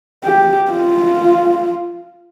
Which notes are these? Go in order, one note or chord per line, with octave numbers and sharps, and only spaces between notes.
G4
F4